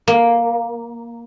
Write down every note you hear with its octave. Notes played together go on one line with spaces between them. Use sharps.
A#3